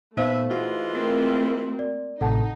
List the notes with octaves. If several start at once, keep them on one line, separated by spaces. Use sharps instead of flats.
A#2 A3 B3 D#4 B4 C5 E5 F5
E3 G#3 F4 F#4
A3 A#3 C4
D5
A1 A2 C3 D#4 A4 F#5 A5